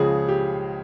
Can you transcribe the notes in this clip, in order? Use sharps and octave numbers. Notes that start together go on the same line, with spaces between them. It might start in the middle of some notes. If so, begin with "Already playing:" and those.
Already playing: C#2 C#3 F3 G#4
G4